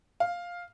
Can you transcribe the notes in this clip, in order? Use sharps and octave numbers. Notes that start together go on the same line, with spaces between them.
F5